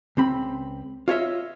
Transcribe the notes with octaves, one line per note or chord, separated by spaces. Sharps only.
C#2 C4 B5
F4 C#5 D#5 E5